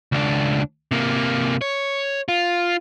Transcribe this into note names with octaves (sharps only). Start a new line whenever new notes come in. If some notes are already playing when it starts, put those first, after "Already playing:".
C#2 D4
C3 A#3
C#5
F4